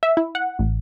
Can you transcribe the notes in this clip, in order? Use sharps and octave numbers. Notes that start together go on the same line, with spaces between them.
E5
E4
F#5
A1